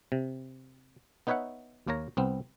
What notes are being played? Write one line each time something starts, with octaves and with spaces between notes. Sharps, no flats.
C3
B3 D#4 B4 C#5 E5 F#5
D#2 A#3 A#4 C#5 A#5
C2 B3 C4